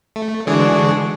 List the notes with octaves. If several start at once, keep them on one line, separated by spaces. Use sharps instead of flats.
A3
D3 E3 G#3 D4 F#4 G#4